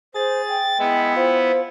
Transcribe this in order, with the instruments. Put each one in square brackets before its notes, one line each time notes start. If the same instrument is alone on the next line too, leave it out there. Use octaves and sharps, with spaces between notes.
[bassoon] G#4 [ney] C5 [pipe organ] A6
[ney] G5
[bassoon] G#3 [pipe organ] B3 E4
[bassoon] F4 [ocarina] C5